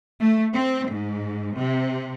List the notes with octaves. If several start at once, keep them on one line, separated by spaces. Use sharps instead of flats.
A3
C4
G#2
C3